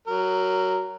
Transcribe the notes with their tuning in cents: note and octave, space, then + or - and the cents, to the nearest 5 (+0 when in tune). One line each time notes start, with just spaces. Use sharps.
F#3 +15 A#4 -10